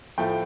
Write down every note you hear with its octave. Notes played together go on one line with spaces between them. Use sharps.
A2 F3 A3 G5